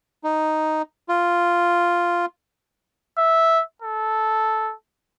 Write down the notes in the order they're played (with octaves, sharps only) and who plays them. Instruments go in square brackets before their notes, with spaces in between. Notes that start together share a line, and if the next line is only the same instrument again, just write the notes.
[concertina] D#4
F4
[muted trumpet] E5
A4